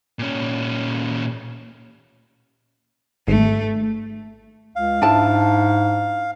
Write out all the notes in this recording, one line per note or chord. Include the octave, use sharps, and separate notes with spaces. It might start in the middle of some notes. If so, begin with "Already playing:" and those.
A#2 C#4
G#1 A3
C#2 F5
G#2 D4 E4 A5